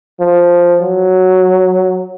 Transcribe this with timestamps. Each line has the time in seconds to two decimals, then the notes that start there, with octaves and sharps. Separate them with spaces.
0.20 F3
0.82 F#3